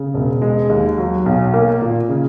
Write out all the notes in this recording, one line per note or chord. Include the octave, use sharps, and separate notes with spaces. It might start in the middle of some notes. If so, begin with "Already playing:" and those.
Already playing: C#3
E1
G#3
D#2
F#3
B1
A#3
A#2
C#3